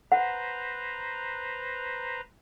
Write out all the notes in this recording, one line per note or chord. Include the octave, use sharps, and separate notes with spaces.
B4 C5 F#5 A#5